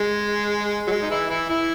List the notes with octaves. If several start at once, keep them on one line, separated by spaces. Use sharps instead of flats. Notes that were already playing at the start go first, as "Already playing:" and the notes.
Already playing: G#3
F#3
G#3
D#4
E3 E4
E3 E4
E3 E4